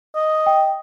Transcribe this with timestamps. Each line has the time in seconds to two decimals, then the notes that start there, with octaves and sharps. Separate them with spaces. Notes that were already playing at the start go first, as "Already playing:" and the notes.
0.15 D#5
0.46 G5